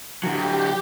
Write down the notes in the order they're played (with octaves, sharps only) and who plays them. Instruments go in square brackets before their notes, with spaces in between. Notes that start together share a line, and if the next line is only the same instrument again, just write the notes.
[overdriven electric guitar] D3 F#3 [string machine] G4